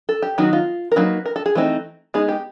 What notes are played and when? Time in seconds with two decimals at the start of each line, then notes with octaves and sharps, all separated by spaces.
0.09 A4
0.22 G4
0.38 D#3 F#3 B3 D#4 F#4
0.53 F4
0.92 A#4
0.96 F#3 A#3 D#4 B4
1.25 A#4
1.36 A4
1.46 G#4
1.55 E3 A3 C4 D#4
2.14 G#3 B3 D#4 G#4
2.29 G4